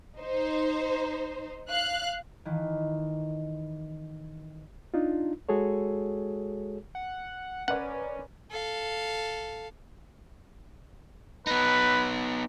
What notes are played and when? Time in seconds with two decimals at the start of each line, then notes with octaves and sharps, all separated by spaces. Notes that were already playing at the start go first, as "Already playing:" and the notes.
0.20 D#4 C5
1.70 F5 F#6
2.45 D#3 E3
4.94 D4 D#4 F4
5.49 G#3 F#4 G#4 A4 C#5
6.95 F#5
7.68 C#4 A#4 B4 D5 F#5
8.51 A4 F5
11.47 B3 D#4 B4